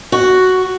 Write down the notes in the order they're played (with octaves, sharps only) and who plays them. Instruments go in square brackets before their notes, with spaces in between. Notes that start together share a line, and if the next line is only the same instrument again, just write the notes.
[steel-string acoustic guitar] F#4